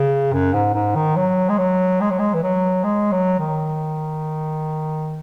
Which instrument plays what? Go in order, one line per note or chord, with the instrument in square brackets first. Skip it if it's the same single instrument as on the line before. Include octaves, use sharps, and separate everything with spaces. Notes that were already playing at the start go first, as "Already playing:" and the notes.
Already playing: [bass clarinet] C#3
F#2
G#2
G#2
D#3
F#3
G#3
F#3
G#3
F#3
G#3
E3
F#3
G#3
F#3
D#3